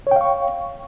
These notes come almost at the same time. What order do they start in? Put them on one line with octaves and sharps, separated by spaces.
C#5 G5 F5 C#6